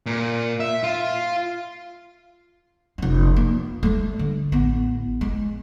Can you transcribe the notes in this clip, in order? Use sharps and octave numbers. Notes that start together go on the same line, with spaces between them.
A#2
E5
F4
F1 F#2
A#3
G3 A3
D3
A1 B3
G#3